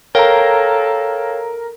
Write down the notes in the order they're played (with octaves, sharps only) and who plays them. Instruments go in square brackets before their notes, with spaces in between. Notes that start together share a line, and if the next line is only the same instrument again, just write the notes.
[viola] A4 [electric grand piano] A#4 A#5 [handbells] C#5 F5 G5